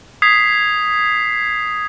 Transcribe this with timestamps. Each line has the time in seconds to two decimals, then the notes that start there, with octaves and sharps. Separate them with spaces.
0.22 D#6 G#6 B6 C7